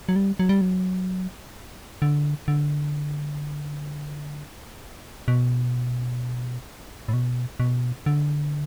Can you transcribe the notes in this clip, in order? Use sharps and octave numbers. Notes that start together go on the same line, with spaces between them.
F#3
G3
F#3
G3
F#3
D3
D3
B2
A2
B2
B2
D3